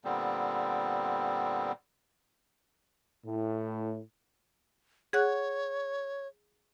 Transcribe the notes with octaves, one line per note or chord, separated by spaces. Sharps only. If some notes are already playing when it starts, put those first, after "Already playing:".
A#2 D3 G3 B3 C4
A2
G#4 C#5 F#5 F#6